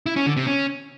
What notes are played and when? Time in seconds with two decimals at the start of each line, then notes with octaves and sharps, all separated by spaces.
0.06 E4
0.16 C#4
0.26 D3
0.36 C3
0.47 C#4